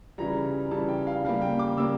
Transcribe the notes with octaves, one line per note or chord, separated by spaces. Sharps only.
C#3 E3 G3 A#5
C#3 E3 G3 A5
G5
F5
C#3 G3 A#3 F5
G5
D6
C#3 G3 A#3 E6